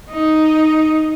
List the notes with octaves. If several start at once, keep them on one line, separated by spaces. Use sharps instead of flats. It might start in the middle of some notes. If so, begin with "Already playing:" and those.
D#4